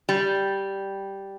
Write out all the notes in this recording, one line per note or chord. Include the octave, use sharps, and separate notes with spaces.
G3